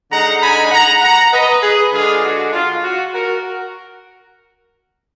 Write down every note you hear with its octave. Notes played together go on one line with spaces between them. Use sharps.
D3 G#3 D#4 F#5 A#5
G#5 B5
F#5 A#5
F#5 A#5
B4 D#5
G#4 B4
D3 G#3 D4 F4 G#4
F#4
F4
F#4
F#4 A#4